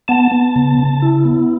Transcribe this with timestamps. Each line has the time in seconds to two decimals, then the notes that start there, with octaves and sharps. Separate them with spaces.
0.08 B3 A5
0.32 B3
0.56 C#3
0.79 C#3
1.02 E4
1.25 B3